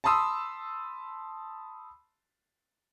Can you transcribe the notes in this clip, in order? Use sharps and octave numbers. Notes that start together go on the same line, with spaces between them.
A5 B5 C6 D#6 E6